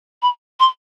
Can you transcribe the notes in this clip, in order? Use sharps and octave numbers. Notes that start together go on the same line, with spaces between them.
B5
C6